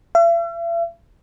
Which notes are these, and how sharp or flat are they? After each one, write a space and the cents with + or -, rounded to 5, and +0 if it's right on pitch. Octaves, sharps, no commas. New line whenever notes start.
E5 +45